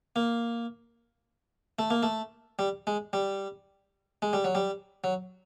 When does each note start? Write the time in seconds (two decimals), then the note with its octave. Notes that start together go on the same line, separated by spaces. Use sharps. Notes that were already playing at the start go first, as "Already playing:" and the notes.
0.16 A#3
1.79 A3
1.90 A#3
2.03 A3
2.59 G3
2.87 G#3
3.13 G3
4.22 G#3
4.33 G3
4.44 F#3
4.55 G3
5.04 F#3